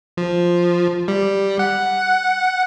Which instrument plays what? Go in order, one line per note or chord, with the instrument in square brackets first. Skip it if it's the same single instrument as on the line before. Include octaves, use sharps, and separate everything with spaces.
[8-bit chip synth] F3
G3
F#5